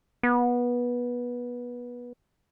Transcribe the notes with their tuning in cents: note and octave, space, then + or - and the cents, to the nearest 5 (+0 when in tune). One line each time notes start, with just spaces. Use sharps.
B3 -20